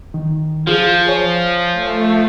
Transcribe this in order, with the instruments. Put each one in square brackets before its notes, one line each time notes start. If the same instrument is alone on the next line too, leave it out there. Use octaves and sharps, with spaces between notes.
[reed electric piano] D#3
[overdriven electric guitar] F3 [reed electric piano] F4 G#4
[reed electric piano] C#5 G#5
[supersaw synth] A3